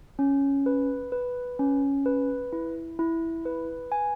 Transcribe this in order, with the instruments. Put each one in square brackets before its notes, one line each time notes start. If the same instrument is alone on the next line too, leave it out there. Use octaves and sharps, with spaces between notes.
[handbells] C#4
B4
B4
C#4
B4
E4
E4
B4
G#5